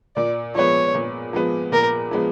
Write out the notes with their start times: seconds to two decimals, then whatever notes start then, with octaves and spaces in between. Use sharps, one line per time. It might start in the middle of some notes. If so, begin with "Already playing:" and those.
0.16 A#2 D5
0.55 F3 G#3 B3 C#5
0.95 A#2
1.33 F3 G#3 B3
1.72 A#2 A#4
2.11 F3 G#3 B3